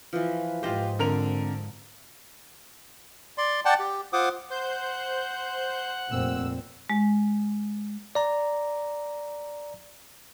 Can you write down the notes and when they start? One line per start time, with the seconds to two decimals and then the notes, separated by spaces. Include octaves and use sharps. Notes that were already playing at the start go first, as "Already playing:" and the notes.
0.13 E3 F3 B4
0.63 G#2 F4 G4 C5 D#5
0.99 D3 C4 A#4 F7
3.38 D5 C6
3.65 D5 F#5 G5 A5
3.79 G4
4.13 F4 C5 F#5 D6 D#6
4.50 C5 F#5 G6
6.11 F1 A#2 C4 E6
6.90 G#3
8.15 D5 A#5